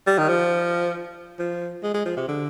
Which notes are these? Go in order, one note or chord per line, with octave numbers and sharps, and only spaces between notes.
G3
D#3
F3
F3
G#3
G#3
F3
C3
D3